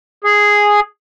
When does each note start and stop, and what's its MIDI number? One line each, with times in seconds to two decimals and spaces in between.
0.24 0.80 68